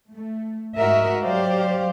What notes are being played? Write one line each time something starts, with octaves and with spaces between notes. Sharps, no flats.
A3
G#2 F#4 A#4 D#5 E5
F#3 G4 C5 D5 F5